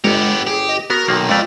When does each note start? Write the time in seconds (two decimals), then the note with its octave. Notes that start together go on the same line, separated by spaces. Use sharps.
0.04 G1 G#3 B3 G4 C#5 A#5
0.47 G4 G#4
0.69 D#5
0.90 B3 F#4 A#4
1.08 B1 C3 D#3 A#3
1.29 F2 G#3 A3 F4 D5